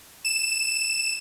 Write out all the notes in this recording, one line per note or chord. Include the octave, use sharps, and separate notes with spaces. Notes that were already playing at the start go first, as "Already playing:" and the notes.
E7